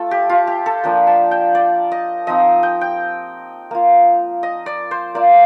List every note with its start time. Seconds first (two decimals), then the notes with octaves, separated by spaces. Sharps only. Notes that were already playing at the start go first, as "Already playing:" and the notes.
Already playing: A3 F4 A4
0.11 G4
0.29 F4
0.47 G4
0.66 A4
0.84 F3 A#3 D4 F4 G5
1.07 A5
1.31 G5
1.55 D5
1.92 D#5
2.27 F3 C4 D#4 D#5
2.63 G5
2.81 G5
3.71 A#3 F4
4.43 D#5
4.66 D5
4.91 C5
5.15 A#3 F4 D5